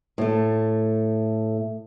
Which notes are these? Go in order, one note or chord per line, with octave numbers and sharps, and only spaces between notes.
A2 A3